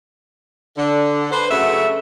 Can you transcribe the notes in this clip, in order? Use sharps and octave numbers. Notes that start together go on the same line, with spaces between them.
D3
B4 C5
C#3 F#3 A3 F#4 E5